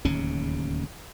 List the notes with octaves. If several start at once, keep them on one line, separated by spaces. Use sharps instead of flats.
D1 D#2 C#3 C#4